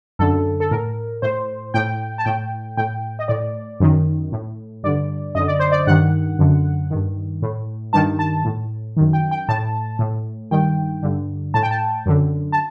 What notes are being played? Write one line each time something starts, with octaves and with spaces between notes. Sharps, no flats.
F#2 D3 A4
A4
A2 A#4
A2 C5
A2 G5
A5
A2 G5
A2 G5
D#5
A2 D5
F#2 D#3
A2
G2 D3 D5
F#2 D3 D#5
D5
C5
D5
G2 D#3 F#5
F#2 D3
G2 D#3
A2
G2 D#3 A5
A5
A2
F#2 D#3
G5
G5
A2 A5
A2
G2 D#3 G5
G2 D3
A2 A5
G5
A5
F#2 D3
A5